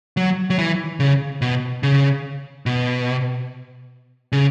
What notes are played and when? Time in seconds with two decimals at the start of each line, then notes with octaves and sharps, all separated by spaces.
0.17 F#3
0.50 F#3
0.58 E3
1.00 C#3
1.42 B2
1.83 C#3
2.66 B2
4.32 C#3